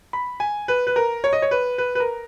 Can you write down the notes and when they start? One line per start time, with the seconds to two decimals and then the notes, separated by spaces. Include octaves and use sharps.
0.13 B5
0.40 G#5
0.68 B4
0.87 B4
0.96 A#4
1.24 C#5
1.33 D#5
1.42 C#5
1.51 B4
1.78 B4
1.95 B4
2.00 A#4